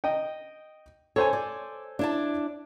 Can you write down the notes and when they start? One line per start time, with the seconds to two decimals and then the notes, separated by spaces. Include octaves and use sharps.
0.04 D#5 G5
1.16 A4 C5 C#5 G#5
1.33 D5
1.99 D4 E4 A5